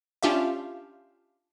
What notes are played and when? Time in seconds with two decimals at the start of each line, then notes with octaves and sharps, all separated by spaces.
0.23 C#4 D4 F4 G4 E5 F5